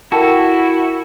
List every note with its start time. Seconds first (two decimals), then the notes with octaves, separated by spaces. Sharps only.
0.12 E4 F#4 A4 A#4 G5